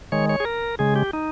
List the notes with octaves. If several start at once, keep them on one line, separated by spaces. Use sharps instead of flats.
D#3 G#3 C#5
C#5
G#4
A#4
C#3 G#3 G#4
G4
D#4